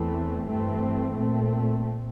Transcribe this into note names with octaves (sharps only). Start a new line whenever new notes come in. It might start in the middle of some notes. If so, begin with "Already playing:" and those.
Already playing: E2 E3 A3 C4
G2 E3 A3 C4
A#2 A3 C4